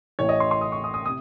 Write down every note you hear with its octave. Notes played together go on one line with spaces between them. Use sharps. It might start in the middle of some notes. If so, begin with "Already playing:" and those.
A1 A2 A3 C#5
D#5
C6
C6
D#6
C#6
D#6
D#6
C3 D#6